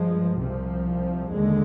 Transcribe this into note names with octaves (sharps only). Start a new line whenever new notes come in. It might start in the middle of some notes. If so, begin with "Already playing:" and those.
Already playing: G2 F3 G#3
C2 C3 F3
D#2 D3 G#3